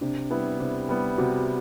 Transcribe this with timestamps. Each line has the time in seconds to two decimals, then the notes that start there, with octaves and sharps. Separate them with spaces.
0.01 C3 D4
0.30 G3 B3 E4
0.60 C3
0.89 G3 B3 E4
1.18 C3 F#4